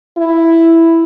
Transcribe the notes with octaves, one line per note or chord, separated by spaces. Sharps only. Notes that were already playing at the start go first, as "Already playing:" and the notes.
E4